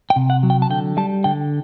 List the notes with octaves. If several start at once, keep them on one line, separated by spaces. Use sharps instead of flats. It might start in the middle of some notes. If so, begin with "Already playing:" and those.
G5
C3
F#5
F#3
G5
A5
D3 G5
G3 A5
D3 G5